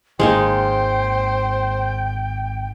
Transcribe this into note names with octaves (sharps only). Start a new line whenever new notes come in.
G#1 G#2 D#3 G#3 A#3 D#4 C5 G5